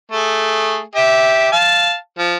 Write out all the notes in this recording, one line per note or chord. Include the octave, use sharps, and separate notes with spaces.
A3 G#4
G4 E5
F5 A5
F3